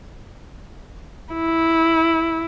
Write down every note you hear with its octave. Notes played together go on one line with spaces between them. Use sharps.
E4